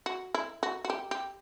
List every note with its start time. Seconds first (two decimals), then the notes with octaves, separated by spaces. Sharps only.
0.06 F#4
0.35 E4
0.63 F#4
0.85 F#4
0.90 G4
1.11 G4